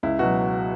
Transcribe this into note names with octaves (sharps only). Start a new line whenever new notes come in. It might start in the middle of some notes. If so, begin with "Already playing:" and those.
C#2 E4
B2 F#3 F#4